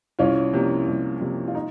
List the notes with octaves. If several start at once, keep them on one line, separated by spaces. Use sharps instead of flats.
C2 C#4 F4
C3 F3 A#3
C2
C3 F3 A#3
F4
D#4